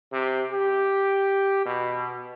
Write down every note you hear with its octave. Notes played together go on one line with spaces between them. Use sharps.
C3
G4
B2